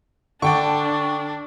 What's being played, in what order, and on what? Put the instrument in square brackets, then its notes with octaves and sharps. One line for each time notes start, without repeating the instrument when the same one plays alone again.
[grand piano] D3 [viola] D4 [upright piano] D5 G5 C#6